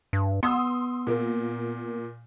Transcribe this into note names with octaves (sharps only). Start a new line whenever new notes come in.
G2
B3 C6 D#6 E6
A#2 A#3